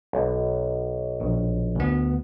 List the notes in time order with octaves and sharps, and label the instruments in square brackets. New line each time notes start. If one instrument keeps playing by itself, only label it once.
[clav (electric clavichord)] B1
[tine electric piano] A#1
D2 B3